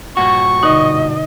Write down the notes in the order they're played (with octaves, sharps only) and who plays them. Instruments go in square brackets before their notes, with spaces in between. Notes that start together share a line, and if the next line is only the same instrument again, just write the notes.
[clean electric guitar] G2 A#2 F#4 [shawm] C#6
[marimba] B2 D3 D#4 [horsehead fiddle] D#5